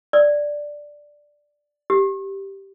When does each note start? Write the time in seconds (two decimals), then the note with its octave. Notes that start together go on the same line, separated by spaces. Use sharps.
0.13 D5
1.90 G4